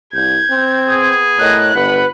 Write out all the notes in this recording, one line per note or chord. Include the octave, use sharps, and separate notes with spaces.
C2 G6 G#6
C4
B3 G#4
A2 A#4 C#5 D#5 F#6
G1 B4 F#5 B5